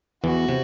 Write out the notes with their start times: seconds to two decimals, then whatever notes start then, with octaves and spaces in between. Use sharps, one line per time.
0.24 E2 E3 F#4
0.49 C3